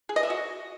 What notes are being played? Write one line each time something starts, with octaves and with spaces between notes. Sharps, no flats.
G#4
D#5
E5
F#4